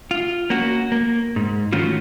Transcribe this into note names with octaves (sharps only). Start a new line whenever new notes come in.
F4
A#3 C#4 F#4
A#3
G#2
D#3 A3 C#4 F4 F#4